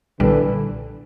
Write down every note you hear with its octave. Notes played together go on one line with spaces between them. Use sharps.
B1 A#2 D3 E3 G3